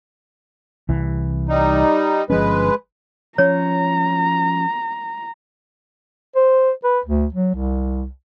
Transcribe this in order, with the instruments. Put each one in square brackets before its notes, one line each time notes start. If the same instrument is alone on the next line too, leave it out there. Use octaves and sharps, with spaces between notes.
[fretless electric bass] C2 E3
[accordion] G3 D#4
[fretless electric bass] G1 F3 C#4 [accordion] G#3 B4
[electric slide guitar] F3 C#4 [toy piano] C#5 [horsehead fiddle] A#5
[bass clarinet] C5
B4
D2
F#3
C2